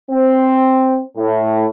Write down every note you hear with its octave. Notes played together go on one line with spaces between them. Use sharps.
C4
A2